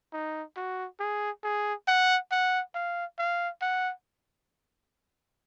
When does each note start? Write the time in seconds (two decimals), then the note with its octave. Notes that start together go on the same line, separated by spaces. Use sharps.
0.13 D#4
0.56 F#4
1.00 G#4
1.44 G#4
1.88 F#5
2.31 F#5
2.75 F5
3.19 F5
3.62 F#5